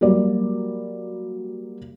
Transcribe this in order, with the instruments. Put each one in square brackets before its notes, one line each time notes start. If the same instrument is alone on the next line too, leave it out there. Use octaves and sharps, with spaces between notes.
[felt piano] F#3 G3 A#3 D5